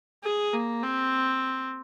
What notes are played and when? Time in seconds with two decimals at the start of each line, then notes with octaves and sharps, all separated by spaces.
0.23 G#4
0.53 A#3
0.83 C4